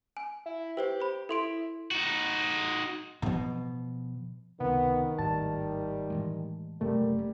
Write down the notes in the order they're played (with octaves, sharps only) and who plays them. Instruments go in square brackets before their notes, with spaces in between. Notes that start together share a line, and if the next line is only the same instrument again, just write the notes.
[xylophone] G#5
[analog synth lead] E4
[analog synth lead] G4 [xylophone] B4 C5 G5
[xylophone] C5 B5
[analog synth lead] E4 [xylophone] A4 C6 D7
[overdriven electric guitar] D#4 F#4
[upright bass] B2 F3
[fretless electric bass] C#2 C3 [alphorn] D#3 [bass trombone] B3
[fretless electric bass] G#1 D#2 A2 [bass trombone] G3 [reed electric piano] A5
[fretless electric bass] A2 E3 G#3
[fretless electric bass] F#1 F#2 C3 [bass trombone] G3 [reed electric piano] A3 [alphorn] A#4